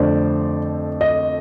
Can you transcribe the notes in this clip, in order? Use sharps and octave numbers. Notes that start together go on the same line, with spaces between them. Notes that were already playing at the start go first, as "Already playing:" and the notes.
Already playing: F2 D3 A3 C5 D5
D#5